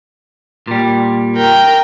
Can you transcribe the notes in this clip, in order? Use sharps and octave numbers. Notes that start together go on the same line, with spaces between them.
A#2 G3
A#4 G5